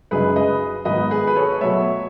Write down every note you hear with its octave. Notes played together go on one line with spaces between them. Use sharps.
F#2 C#3 G#3 D#4 G#4 B4
B4 D#5
G#2 D#3 F#3 B3 B4 D#5
G#4 B4
B4
A4 C#5
B2 F#3 A3 C#5 E5